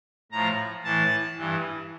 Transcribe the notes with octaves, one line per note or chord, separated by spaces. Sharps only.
A2 F3 A#5
A2 E3 A5
G2 E3